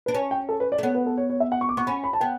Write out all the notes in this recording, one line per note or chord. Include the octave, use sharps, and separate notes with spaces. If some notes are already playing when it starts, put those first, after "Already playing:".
D4 B4
C#4 C#5
G5
A4
B4
D5
A3
B3 C#5
B4
A4
C#5
C#5
E5
F#5
C#6
D6
B3 C#6
C#4 B5
B5
A5
B3 G5